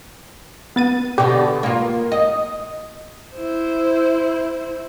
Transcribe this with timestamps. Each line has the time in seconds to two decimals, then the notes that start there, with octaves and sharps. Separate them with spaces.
0.76 B3 A6 D#7
1.18 B2 D3 G4
1.63 A#3 F4
2.12 D#5
3.35 E4 C5